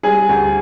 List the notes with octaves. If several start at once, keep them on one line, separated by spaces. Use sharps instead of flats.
G3 G#4
D2